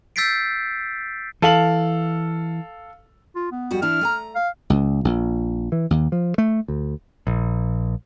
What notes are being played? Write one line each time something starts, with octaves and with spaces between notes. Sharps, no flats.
E6 G6 A6 B6 C7 D7
E3 A4 F5 F#7
F4
B3
F2 G3 F#4
E3 D4 E4 F6
A3 G#5 A#5
F5
C#2
A#1
E3
D#2
F3
A3
D2
A#1